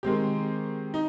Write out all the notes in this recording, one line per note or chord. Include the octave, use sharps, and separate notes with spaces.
D#3 G#3 C4 G4
D#4